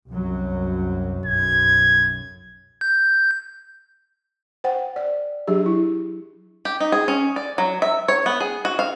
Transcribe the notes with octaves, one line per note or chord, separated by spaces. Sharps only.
C2 F#2 F#3
B1 F#2 G#6
G6
C5 F#5 G5
D5
F#3 D4 G4 G#4
E4
G4
D#4
G#4
C#4
D5
F#3
E5
C#5
B3
G#4
F#4
F5